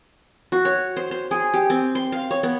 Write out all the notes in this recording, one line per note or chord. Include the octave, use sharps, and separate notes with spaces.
F#4
C#5
C5
C5
G#4
G4
C4
C6
F5
C#5
B3